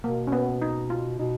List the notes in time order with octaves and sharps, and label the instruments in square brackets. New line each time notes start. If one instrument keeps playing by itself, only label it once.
[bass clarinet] B2 [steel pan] A#3
[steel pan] C#4
B3
D#4
F4
[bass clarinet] B2 [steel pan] D#4